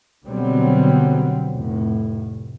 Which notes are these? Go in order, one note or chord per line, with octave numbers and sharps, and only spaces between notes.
B2 D3 F#3 G3 B3 C4
F1 A2